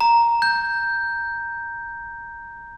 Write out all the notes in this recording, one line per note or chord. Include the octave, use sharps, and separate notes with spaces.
A#5
G6